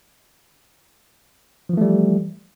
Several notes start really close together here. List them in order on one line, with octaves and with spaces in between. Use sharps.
F3 E3 A3 G3